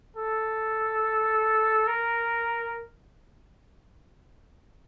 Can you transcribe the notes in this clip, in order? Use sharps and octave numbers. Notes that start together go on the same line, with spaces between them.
A4
A#4